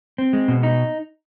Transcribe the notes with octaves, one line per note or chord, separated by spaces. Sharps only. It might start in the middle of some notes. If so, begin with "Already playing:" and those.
C4
G#3
B2
D#4